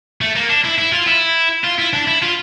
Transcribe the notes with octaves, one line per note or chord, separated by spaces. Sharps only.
A3
A#3
D4
E4
E4
F4
E4
F4
E4
D4
E4
F4